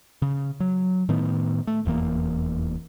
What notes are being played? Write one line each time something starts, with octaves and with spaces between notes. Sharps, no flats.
C#3
F#3
A2 D#3 B3
A3
F1 E2 E3 A#3